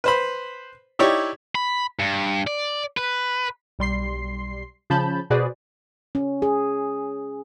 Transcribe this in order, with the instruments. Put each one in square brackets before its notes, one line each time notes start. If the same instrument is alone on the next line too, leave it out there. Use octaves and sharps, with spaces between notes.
[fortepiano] B4 C5 B5
D#4 E4 G4 C#5 D5
[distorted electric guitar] B5
G2
D5
B4
[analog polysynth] B1 G3 C6 C7
C#3 F3 C#4 A5 B5 G6
B2 F#4 G#4 B4 C5 D5
[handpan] C#4
G#4